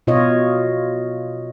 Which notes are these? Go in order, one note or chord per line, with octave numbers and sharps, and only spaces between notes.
B2 F4 C#5 D#5